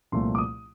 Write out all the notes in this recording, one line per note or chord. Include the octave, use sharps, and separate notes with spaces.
C2 A#2 F3 A3 C6
D6
D#6